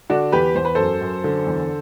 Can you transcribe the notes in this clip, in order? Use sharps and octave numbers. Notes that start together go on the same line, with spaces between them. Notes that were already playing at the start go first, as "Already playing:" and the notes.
D3 D4 F#4
E2 G4 B4
E2 C5
B4
F#2 A4 C5
F#2
D3
E2